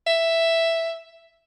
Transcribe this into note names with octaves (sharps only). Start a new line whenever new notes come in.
E5